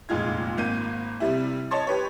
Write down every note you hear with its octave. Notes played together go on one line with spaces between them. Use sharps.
F1 A#2 G#3 D#4 F4 G#6
G#1 A#3 G6 D#7
C3 G3 E4
C#5 D#5 A5 C6 G#6 A6
G4 B4 C#5